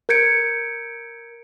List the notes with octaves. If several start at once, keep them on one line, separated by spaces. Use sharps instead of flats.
A#4 G6 G#6 C#7 D7